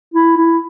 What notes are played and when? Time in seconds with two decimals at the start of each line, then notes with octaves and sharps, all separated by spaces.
0.14 E4
0.37 E4